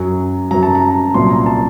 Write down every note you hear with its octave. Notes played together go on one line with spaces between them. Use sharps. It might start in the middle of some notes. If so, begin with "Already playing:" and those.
Already playing: F#2 F#3
F#2 F#3 A#5
A5
A#5
C2 A#2 F#3 C6
A#5
A5